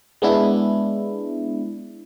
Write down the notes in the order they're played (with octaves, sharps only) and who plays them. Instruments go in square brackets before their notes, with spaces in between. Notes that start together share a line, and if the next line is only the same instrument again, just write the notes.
[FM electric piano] G#3 B3 D4 E4